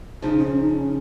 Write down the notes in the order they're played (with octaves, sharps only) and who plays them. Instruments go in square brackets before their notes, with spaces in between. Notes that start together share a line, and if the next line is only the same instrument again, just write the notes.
[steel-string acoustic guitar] C#3 F3 [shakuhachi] D#4
[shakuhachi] C#4
D#4
C#4